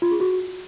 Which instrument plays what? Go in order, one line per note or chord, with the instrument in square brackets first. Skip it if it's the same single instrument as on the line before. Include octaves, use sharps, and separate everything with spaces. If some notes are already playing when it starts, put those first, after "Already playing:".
[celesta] F4
G#4
F#4